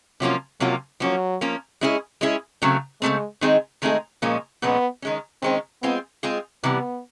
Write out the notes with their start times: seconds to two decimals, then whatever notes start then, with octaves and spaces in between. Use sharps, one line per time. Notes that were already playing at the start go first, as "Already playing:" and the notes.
0.20 C3 F3 F#3 A#3 C#4 F4
0.60 C3 F3 F#3 A#3 C#4 F4
1.00 F3 F#3 A#3 C#4
1.41 F3 A#3 C#4
1.81 G#3 C#4 E4 G#4
2.21 G#3 C#4 E4 G#4
2.62 C#3 F#3 A3 C4
3.01 C#3 F#3 G#3 A3 C4
3.41 D#3 G#3 C4 D#4 G#4
3.82 D#3 G#3 A3 C4 D#4 G#4
4.22 A#2 F3 G#3 A#3 C#4
4.62 A#2 F3 G#3 B3 C#4
5.02 D#3 G#3 C#4
5.42 D#3 G#3 C4 C#4
5.82 G#3 B3 C4 F4 G#4
6.23 G#3 C4 F4 G#4
6.63 C3 E3 G3 B3